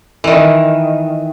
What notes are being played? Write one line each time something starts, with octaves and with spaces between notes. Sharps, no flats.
D#3 E3